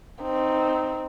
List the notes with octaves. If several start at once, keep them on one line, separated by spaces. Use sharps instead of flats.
C4 D#4